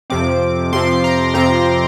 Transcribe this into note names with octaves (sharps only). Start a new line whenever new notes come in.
F2 C3 F3 C4 D6
F2 C3 F3 C4 C6
A#5
F2 C3 F3 C4 A#5